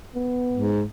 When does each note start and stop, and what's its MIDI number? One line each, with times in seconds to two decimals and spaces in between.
0.15 0.76 59
0.53 0.84 44